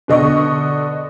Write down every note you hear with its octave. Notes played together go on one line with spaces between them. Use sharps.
B2 D3 D#5 C#6